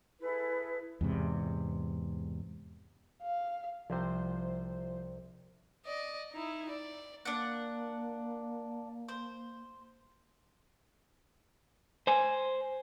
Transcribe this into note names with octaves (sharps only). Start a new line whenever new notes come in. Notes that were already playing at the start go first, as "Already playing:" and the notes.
E4 G#4 A4 B4
E2 G#2 C3
F5
C2 C3 F3 C5
D5 D#5
D#4 E4
D5
A#3 D4 F#5
C5
C5 G#5